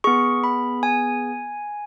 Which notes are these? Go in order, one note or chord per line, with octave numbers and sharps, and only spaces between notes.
B3 G#4 C#6
B5
G#5